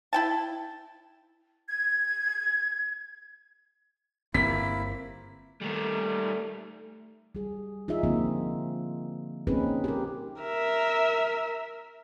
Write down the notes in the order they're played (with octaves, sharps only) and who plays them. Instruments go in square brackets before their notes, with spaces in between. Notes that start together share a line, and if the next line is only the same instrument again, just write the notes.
[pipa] E4 G5 A5
[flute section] G#6
[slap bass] G1 C4 [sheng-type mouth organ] A#3 E4 [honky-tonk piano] B6
[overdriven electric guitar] D#3 G3 [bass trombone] A3
[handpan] G3 G#4
D#4 F4 G#4 E5
D3 F3 A#3 C4
A#3 C4 C#4 D#4 G#4 B4
G4 A#4
[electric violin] A#4 E5